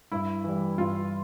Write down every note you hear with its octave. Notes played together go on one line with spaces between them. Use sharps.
G2 E4
E3 G3
G2 F4